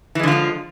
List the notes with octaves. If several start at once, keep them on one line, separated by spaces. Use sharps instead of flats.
D3 E3 F3 G#3 F4